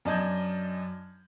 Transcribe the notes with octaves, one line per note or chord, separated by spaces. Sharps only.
F#2 D4 D#5 A5 G6 G#6